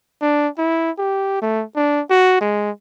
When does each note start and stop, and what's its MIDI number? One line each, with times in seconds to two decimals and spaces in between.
0.22 0.48 62
0.58 0.91 64
0.98 1.38 67
1.42 1.64 57
1.76 2.01 62
2.10 2.37 66
2.41 2.70 56